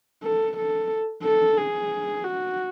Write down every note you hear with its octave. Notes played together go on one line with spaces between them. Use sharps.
A4
A4
A4
G#4
F#4